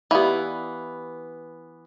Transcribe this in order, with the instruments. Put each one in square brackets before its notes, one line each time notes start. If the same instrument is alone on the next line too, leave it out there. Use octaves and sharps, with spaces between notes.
[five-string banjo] E3 B3 [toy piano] G4 D5 F5